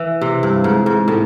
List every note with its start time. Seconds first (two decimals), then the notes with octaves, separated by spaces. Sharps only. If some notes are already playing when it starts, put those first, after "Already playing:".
Already playing: E3
0.21 C3
0.43 G2
0.64 G#2
0.86 G#2
1.08 A2